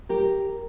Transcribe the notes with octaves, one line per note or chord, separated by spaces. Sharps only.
G4 A#4